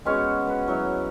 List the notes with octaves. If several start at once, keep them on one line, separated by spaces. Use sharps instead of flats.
G#3 B3 C#4 F#4
B4
F#3 E4 C#5